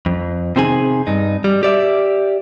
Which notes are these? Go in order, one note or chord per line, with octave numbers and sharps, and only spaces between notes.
F2
C3 D#3 C4 D#4 G#4 G#5
G2 D#4
G3
G4 D5 E5